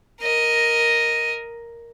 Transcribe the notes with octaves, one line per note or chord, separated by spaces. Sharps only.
A#4 D#5